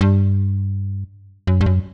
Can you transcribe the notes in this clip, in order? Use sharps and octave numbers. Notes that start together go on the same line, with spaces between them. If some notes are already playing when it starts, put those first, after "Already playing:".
G2
F#2
G2
F#2